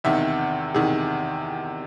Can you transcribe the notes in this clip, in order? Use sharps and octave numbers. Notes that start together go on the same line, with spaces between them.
E2 C3 D#3 E5
E2 C3 D#3 G#4